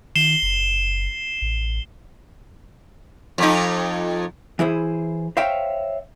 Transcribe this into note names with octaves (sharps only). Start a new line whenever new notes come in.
D#3 C7 E7 G7
F#1
A1
F2 D#4
E3 E4 G#4 C5
C5 C#5 E5 F5 G5